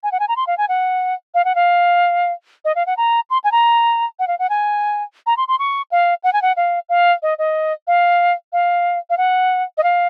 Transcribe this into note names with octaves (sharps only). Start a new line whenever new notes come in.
G#5
F#5
G#5
A#5
C6
F5
G#5
F#5
F5
F#5
F5
D#5
F5
F#5
A#5
C6
G#5
A#5
F#5
F5
F#5
G#5
A#5
C6
C6
C#6
F5
F#5
G#5
F#5
F5
F5
D#5
D#5
F5
F5
F5
F#5
D#5
F5